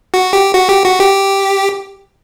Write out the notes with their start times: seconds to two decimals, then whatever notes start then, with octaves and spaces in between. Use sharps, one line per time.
0.14 F#4
0.33 G4
0.54 F#4
0.69 G4
0.85 F#4
1.00 G4